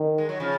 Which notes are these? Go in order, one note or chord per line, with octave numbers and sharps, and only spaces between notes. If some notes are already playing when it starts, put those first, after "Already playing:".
Already playing: D#3
G#3
F#3
C#3 F3